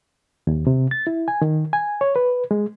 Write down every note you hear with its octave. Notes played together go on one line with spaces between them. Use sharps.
D#2
C3
A6
E4
G#5
D#3
G#5
C#5
B4
G#3